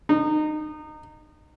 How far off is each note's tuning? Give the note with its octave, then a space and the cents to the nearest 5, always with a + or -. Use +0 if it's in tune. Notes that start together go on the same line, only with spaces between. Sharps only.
D#4 -25